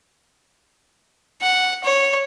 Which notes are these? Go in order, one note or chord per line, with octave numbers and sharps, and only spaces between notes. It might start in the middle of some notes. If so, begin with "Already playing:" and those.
F#5
C#5